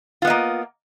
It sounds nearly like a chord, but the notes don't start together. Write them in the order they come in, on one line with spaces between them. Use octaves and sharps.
F4 B3 D#5 A#3